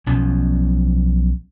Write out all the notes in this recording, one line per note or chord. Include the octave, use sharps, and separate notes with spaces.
B1 B2 F3 C#4